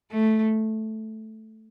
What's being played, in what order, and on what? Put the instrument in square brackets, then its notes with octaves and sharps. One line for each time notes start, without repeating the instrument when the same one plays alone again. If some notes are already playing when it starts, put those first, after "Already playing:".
[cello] A3